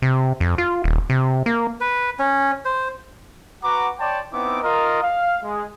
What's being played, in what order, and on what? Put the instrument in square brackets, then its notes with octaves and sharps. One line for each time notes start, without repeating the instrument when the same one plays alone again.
[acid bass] C3
F2
F4
D#1
C3
A#3
[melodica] B4
C#4
C5
[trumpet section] F#4 B4 F#5 A#5 D6
C#5 D5 G5 A5 C6 D6
B3 C4 D#4 E4 D6
F4 A#4 D#5
F5
G#3